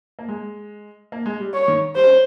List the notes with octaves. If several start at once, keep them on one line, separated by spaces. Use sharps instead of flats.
A#3
G#3
A#3
G#3
G3
C#5
D#3
G3 C5
C#4